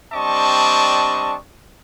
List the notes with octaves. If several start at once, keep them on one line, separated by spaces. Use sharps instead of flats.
G3 C4 D4 D#5 A5 C#6